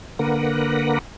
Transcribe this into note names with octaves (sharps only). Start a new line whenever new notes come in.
D3 A#3 A#4 B4 F#5